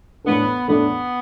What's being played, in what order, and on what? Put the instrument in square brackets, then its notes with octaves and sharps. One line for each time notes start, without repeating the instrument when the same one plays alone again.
[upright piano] A2 E3 A3 D4 A4 [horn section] B3
[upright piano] A2 E3 A3 D4 A4 [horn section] B3